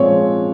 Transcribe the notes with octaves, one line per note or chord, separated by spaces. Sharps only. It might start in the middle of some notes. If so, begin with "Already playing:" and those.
Already playing: A#2 F3 G#3 C4 C#5